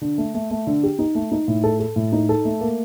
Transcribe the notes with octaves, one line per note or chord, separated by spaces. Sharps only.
D3
A3
A3
A3
D3
G4
D#4
A3
D#4
A2
A4
A4
A2
D#4
A4
A3
A#3